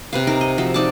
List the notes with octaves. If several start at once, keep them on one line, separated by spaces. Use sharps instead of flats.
C3 B4 F5
D#4 A#4
D#5
F3 F#4 E5
D#4 D5 A5